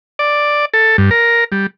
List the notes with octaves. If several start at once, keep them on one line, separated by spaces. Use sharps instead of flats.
D5
A4
G2
A#4
G3